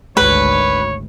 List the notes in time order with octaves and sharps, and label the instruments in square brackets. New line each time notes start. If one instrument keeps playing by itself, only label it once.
[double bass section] G#1 D2 [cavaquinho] B4 [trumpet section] C#5